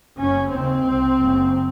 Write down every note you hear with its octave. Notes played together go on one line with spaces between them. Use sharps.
F#1 F#2 C#3 C#4
D#2 C#3 C4
C2 C3
F#1 F#2 C#3